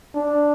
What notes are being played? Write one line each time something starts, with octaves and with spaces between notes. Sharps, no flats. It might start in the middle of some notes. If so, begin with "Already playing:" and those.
D4